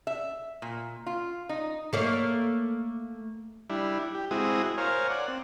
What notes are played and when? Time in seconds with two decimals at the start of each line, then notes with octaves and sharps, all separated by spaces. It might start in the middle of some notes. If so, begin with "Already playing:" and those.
0.07 E5
0.62 A#2
1.06 F4
1.49 D#4
1.93 A3 A#3 C#5
3.70 G3 D4 E4
4.15 G4
4.31 G#3 C4 E4 F#4 G#4 D#6
4.78 A#4 C5 C#5 F5 G#5
5.10 D5 F#5
5.28 C4